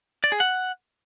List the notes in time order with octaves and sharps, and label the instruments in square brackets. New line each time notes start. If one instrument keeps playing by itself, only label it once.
[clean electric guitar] D5
G#4
F#5